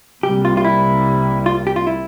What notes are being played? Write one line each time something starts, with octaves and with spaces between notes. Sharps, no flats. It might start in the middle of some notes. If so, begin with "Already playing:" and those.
C2 C3 G3 A#3 G4
F4
F4
E4
F4
G4
F4
E4